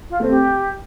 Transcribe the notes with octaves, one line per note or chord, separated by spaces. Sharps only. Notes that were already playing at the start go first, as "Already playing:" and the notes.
F4
A3 C4
G4